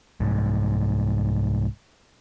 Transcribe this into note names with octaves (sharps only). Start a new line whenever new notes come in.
C2 G#2